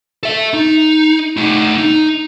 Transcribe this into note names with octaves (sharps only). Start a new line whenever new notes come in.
A4 E5
D#4
A3 D#4
D#4